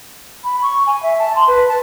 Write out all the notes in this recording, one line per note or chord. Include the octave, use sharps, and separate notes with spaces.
B5
C#6
G#5
E5
A5
C6
B4
A5